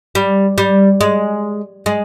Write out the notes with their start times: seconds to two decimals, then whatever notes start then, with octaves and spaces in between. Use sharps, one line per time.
0.15 G3
0.58 G3
1.01 G#3
1.86 G#3